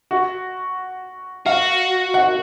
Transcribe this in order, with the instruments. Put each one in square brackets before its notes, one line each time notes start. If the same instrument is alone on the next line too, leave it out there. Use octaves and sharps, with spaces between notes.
[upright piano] F#4
[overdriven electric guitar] F#4 [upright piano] F5
[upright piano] F#5